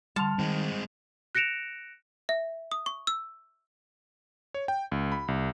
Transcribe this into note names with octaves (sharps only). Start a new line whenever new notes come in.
D3 G3 A5 C6 F6 F7
D#3 G#3 C4
F#6 A#6 C#7 D7 E7 F7
E5
D#6
C#6
E6
C#5
G5
C#2
B5
C2